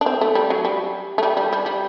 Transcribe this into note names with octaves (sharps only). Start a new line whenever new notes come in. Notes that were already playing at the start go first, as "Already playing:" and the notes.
D4
C4
A3
G3
F#3
G3
A3
G3
G3
G3
G3